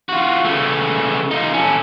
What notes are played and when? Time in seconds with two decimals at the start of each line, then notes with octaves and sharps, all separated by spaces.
0.09 F4 F#4
0.45 C#3 A3
1.31 D#4 F4
1.54 C#4 A4